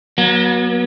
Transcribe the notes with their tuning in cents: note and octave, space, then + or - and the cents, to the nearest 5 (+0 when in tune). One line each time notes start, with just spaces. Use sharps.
F#3 +0 B3 -45